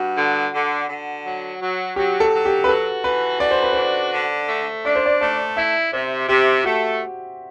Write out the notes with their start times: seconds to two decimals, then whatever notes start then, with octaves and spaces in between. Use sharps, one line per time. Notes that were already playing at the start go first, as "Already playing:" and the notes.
Already playing: G2 F#4
0.16 D3
0.53 D3
0.89 D3
1.25 F#3
1.61 F#3
1.96 F#3 G4
2.20 A4
2.33 F#3
2.45 G4
2.64 B4
2.68 F#4 A4
3.04 E3 B4
3.40 F#4 D5
3.51 C5
3.63 B4
3.73 D4 C5
4.13 D3
4.48 A3
4.85 D4 D5
4.96 C5
5.06 D5
5.20 A3 D5
5.57 E4 E5
5.93 C3 C5
6.29 C3 G4
6.64 A3 F#4